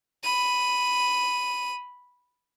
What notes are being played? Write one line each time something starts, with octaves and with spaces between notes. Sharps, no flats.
B5 D#7